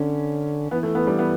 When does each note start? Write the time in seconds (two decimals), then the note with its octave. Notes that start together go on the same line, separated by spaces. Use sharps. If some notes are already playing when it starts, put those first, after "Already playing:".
Already playing: D3 C#4
0.71 E3 B3
0.83 A3
0.95 B3
1.07 G3
1.18 B3